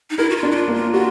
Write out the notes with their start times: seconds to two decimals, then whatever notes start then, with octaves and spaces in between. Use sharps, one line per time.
0.10 D#4
0.18 E4 A#4
0.30 F#4
0.37 F4
0.43 D4
0.51 E4
0.56 F4
0.68 A#3
0.75 F4
0.93 F4 F#4